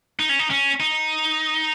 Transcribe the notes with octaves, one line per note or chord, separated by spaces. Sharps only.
D#4
C#4
D#4
C#4
D#4